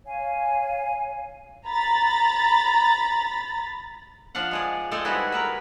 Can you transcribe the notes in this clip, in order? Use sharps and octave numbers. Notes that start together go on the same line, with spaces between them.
C#5 F5 G#5
A#5 B5 A6
F3 D4 F5 F#5
G#3 G#4 D5
G#3 A3 C4 A4 D5 G#5
G3 G#3 B3 E4 F#4 G#4
A#4 B4 E5